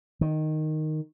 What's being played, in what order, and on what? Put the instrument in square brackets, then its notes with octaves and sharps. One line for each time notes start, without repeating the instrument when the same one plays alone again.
[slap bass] D#3